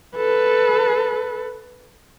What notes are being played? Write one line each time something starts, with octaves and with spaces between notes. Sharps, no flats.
A4 B4